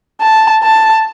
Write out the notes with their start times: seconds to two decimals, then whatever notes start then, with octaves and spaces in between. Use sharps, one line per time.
0.21 A5
0.63 A5